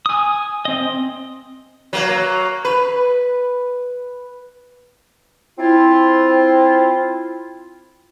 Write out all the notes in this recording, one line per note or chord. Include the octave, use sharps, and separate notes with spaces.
G#5 D#6
C4 D#5
F#3 A#3
B4
C4 E4 F4